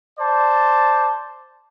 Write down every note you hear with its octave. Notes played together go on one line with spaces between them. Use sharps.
C5 D5 A5